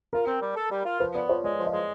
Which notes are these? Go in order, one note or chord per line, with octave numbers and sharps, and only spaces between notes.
F4 A#4
C4
G3
A4
G3
F4
F3 B4
B3 D5
F3 C#5
G#3 D5
F3
D#5
G#3